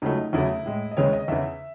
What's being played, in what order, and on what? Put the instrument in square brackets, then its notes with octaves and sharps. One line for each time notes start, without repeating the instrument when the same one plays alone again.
[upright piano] C#2 C#3 F#3 A3 D#4
E2 C#3 F#3 A3 E4
A2 G#3
D#5
D#2 C#3 E3 G#3 C#5
D#5
E2 C#3 E3 E5